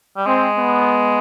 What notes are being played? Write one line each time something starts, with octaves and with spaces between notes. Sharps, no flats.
G3
G#3 C4
B3